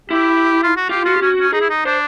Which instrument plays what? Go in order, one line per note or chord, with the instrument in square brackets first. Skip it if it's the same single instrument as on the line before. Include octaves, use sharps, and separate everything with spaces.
[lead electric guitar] E4 [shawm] G4
[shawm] F4
F#4
[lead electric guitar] F4 [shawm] G4
[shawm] F4 [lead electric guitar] F#4
[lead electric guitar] G4
[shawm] C#4 [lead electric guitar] F#4
[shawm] C#4
[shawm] D#4 [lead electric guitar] G#4
[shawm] E4
D#4
[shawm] D4 [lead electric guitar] C5